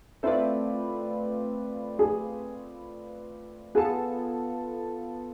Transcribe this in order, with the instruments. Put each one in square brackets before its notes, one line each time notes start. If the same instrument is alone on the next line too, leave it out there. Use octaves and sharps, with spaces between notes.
[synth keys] A3 C4 F4 B4 D5 [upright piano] E4
[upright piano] G#4
[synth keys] B3 F4 A4 [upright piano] G#4